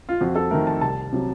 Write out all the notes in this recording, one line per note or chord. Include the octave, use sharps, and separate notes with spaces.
F4
F2 F#4
A4
D#3 A3 A#4
A5
C2 A5
C3 F#3